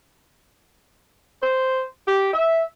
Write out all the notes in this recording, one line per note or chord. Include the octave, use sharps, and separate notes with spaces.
C5
G4
E5